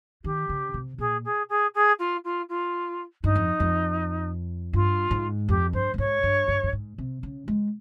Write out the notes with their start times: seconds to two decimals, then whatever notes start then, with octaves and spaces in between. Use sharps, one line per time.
0.24 D#3 G4
0.49 C#3
0.74 C3
0.98 A#2 G#4
1.24 G#4
1.48 G#4
1.74 G#4
1.99 F4
2.24 F4
2.48 F4
3.23 G2 D#4
3.35 F2
3.60 F2
4.73 G2 F4
5.11 G#2
5.48 F2 G4
5.73 G2 C5
5.94 A#2
5.98 G#2 C#5
6.23 G2
6.48 G2
6.63 G2
6.73 G#2
6.98 C3
7.23 C#3
7.48 G#3